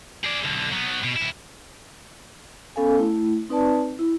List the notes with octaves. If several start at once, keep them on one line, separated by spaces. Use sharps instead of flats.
G#4 D5
B1 D3
F#3 B3
B2
D2 E4
B3 C#4 A4 F5 G#5
A3 E4
C4 D#4 B4 D5 A5
E4